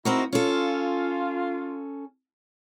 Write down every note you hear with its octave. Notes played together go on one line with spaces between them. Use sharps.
C4 D#4 E4 F#4 A#4
C#4 F4 A4